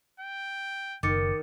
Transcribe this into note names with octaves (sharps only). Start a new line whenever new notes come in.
G5
F#1 D#3 D6 A6 C#7